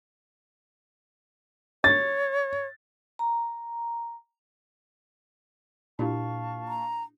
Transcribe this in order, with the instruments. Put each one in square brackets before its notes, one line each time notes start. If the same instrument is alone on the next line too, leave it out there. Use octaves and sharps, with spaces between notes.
[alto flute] C#5 [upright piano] A6
[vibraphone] A#5
[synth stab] A#2 [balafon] D4 E4 G4 [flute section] F5 A5 C#6
[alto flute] A#5